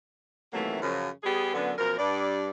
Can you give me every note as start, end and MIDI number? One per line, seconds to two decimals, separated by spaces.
0.53 0.78 48
0.53 0.78 51
0.53 0.78 52
0.53 0.78 54
0.53 0.78 57
0.53 0.78 58
0.81 1.09 42
0.81 1.09 49
0.81 1.09 53
1.23 1.50 55
1.23 1.50 59
1.23 1.50 67
1.23 1.50 68
1.53 1.72 42
1.53 1.72 50
1.53 1.72 59
1.78 1.94 42
1.78 1.94 47
1.78 1.94 53
1.78 1.94 70
1.98 2.50 43
1.98 2.50 74